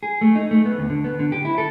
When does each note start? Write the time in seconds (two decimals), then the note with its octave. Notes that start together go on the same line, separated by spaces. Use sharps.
0.03 G#4
0.21 A3
0.35 D#4
0.51 A3
0.65 B3
0.78 D2
0.90 D3
1.04 B3
1.19 D3
1.32 G4
1.45 E4
1.58 A4